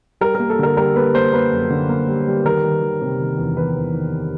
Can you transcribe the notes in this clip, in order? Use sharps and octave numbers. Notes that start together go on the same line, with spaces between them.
G3 A#4
A#3 A#4
A4
D3 A#4
G3 A#4
A#3 B4
A#3 C5
A#3 B4
F#2
D3
A#3
G3
G3
D#3 A#4
D#3
D#3
C3
D#3
E2
E2 B4
E2
D#3